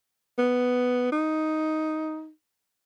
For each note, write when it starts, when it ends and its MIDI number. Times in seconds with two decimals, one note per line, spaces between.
0.38 1.12 59
1.12 2.30 63